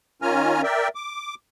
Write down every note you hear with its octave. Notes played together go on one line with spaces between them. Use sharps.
D#3 C#4 F4 G#5 A#5 F6
A#4 D5 E5 G5
D6